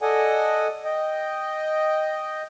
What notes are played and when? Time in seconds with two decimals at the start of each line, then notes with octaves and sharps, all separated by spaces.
0.01 A4 D5 D#5 F#5 G#5
0.85 D#5 G5